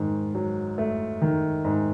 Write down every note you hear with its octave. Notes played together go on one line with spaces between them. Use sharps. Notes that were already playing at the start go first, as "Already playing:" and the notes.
Already playing: G#2 D#3
F#3
A3
D#3
G#2